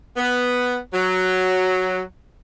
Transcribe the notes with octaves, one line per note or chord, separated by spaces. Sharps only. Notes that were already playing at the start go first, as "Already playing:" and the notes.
B3
F#3